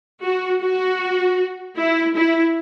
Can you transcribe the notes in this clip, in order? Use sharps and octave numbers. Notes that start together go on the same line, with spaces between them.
F#4
F#4
E4
E4